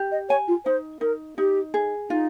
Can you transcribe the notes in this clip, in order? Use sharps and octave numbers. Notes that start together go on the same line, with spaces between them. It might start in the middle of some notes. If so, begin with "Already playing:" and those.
Already playing: G4
D#5
C#5 G#5
F4
D#4 C5
D#4 A#4
D#4 G4
G#4
D#4 F4